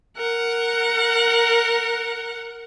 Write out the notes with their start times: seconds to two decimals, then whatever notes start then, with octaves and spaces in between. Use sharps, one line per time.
0.17 A#4 F#5